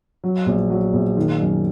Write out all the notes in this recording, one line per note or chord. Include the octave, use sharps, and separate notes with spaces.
F#3
A#1
F#3
A#1
D#3
F#2